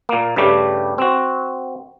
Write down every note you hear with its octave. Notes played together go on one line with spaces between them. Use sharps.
A#2 A#3
G2 C#3 G3 A3 G4
C4 F#4